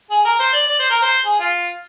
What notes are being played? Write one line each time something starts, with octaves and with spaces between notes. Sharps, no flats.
G#4
A#4
C5
D5
D5
C5
A#4
C5
G#4
F4